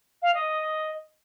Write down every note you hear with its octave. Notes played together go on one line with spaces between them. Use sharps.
F5
D#5